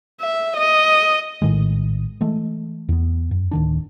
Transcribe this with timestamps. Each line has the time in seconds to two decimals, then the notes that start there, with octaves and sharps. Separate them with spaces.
0.21 E5
0.57 D#5
1.42 A#1 A2 D#3 G#3
2.21 E3 G#3 A3
2.89 E2 B3
3.31 F#2
3.51 D1 D#3 D4